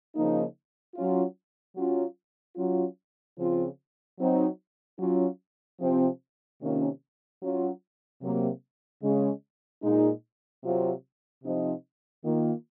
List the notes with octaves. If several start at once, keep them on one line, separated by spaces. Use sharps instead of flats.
C#3 F3 A#3 D#4
F#3 C#4 F4
F#3 C#4 F4
F#3 C#4 F4
C#3 F3 C4 F4
F#3 C4 D#4
F#3 C#4 F4
C3 F3 C4
C3 D#3 A#3 C#4 F4
F#3 C#4 F4
C3 F#3 A#3
C#3 G#3 C#4
A#2 G#3 D#4
C3 F#3 C4 F4
C3 F3 C4 D#4
D#3 A#3 F4